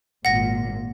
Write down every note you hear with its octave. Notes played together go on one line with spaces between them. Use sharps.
G#1 A#2 F#5 A#6